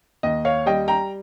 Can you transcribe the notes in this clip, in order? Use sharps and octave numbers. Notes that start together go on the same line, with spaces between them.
D#2 D#5
C#5 F5
G3 D#5 G5
G5 A#5